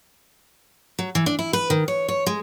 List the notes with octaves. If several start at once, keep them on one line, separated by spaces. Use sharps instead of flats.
F#3
E3
D4
E4
B4
D#3
C#5
C#5
G#3